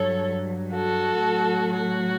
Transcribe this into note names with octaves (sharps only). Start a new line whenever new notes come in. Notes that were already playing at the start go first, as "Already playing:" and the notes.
Already playing: G2 F#3 A4 C#5
F#4 A4
A2 F#3
F#4